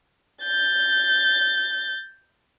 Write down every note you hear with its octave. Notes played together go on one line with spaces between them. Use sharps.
G6 A6